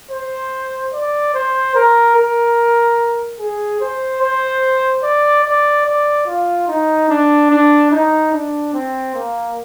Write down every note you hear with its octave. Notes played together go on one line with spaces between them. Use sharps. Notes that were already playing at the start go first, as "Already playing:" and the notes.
C5
D5
C5
A#4
A#4
G#4
C5
C5
D5
D5
D5
F4
D#4
D4
D4
D#4
D4
C4
A#3